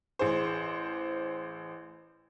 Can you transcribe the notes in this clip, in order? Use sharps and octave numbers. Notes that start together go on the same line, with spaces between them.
A1 G#4 C5